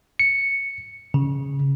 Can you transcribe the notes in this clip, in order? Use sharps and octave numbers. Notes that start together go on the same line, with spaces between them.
C#7
C#3